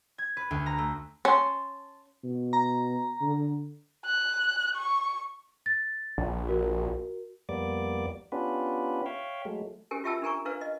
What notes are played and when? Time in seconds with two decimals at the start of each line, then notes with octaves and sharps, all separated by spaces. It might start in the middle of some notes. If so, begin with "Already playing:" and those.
0.18 G#6
0.37 B4
0.51 D2
0.66 A#5
0.78 A3
1.25 C#4 A5 C6
2.24 B2
2.53 A#5
3.21 D3
4.06 F#6
4.75 C#6
5.66 A6
6.18 A#1
6.49 F#4 A#4
7.49 F2 G3 A#3 B3 D5 D6
8.32 B3 C#4 D4 F4 G4 B4
9.06 C#5 E5 F5 G5
9.45 F#3 G#3 A3
9.91 C#4 G4 A#4 G#5
10.04 F4 G4 E5 G5 A5 E6
10.22 D4 G4 A#4 G#5 A#5 C#6
10.45 D4 A#4 B4 C#5 F5
10.61 D#5